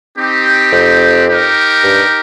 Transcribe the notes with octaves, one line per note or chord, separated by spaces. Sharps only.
C4 D#4 G4
F2
D#4 G4 A#4
G2